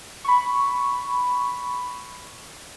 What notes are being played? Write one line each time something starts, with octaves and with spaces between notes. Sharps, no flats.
B5 C#6